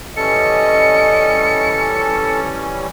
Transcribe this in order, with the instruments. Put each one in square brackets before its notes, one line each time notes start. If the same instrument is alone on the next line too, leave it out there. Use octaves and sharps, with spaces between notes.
[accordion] E3 G3 C#4 [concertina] A4 [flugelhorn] D#5 [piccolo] C#7